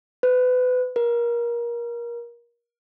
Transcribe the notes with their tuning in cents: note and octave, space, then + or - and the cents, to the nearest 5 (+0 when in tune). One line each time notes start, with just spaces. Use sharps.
B4 +30
A#4 +25